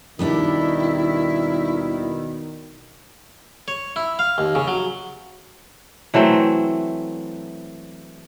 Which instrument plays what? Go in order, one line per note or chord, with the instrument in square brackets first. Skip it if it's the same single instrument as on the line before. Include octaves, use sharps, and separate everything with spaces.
[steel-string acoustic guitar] D#2 G3 D4 [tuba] B2 [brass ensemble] D#3 [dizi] E4
[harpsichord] C#5
E4
F5
D#2
C#3
F#3
[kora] E3 F#3 A3 C4